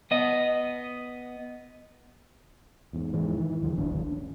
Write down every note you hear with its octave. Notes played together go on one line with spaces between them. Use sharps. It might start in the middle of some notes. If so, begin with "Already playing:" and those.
B3 D#5
E2 G#2
F1 G#2 E3 G#3
D#3 E3
D#2 D3 F3 G#3
D1 G#1 D4
C#4